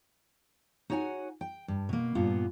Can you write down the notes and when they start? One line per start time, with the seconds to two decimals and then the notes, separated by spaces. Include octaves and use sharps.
0.90 D#4 F#4 C#5 F#5 G#5
1.41 G5
1.68 G2
1.89 B2 A#3
2.15 G2 A#2 B3 F4